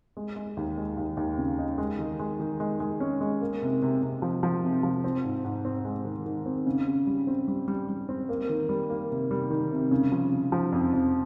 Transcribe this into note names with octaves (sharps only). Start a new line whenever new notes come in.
G#3
G#3
D#2
G#3
D#2
D#2
C#3
D#4
G#3
D#3
G#3
D#3
G#3
G#3
C#4
G#3
A#3
C3
C3
C3
F3
F3
C3
F3
C4
G#2
G#2
C4
G#3
D#3
D#3
C4
C#3
C#3
G3
C4
G3
G3
G3
C4
A#3
D#3
G3
A#3
C3
G3
D#3
C3
C#3
F3
C#3
F3
F2
F2